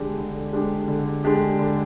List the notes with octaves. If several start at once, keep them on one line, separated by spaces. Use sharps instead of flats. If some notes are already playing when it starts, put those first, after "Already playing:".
Already playing: D3 G#3 D4 G4
D3
G#3 D4 G4
D3
G#3 D4 G4
D3